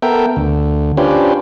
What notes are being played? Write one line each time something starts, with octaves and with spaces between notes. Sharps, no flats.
B3 A4 A#4 E5 G5
D2
C#4 D4 F4 G4 B4 C5